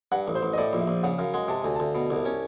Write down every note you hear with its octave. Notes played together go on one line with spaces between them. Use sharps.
G2 F#5
A1
C5
A1
D#5
A2 D5
A#1
E5
A#1
C#3 F#5
F#2 F5
G#3 F#5
C3 A5
D2 G#5
D2 A5
B2
C2
C#4